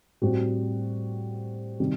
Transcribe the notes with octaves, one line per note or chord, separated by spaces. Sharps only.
A2 G3 C4 F#4
C3 D#3 G3